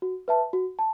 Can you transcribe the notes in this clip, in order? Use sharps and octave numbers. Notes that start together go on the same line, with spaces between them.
F#4
B4 E5 A5
F#4
A5